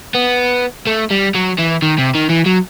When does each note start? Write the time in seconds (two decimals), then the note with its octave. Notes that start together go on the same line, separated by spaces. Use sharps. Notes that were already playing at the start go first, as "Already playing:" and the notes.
0.15 B3
0.87 A3
1.10 G3
1.35 F#3
1.58 E3
1.82 D#3
1.98 C3
2.15 D#3
2.30 E3
2.46 F#3